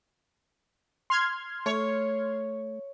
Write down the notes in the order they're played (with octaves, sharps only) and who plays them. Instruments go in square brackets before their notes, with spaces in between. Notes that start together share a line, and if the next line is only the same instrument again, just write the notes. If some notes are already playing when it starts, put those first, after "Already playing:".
[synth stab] C6 F6 G#6
[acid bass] A3 [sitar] C#5